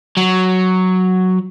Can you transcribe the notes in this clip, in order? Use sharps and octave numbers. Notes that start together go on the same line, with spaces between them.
F#3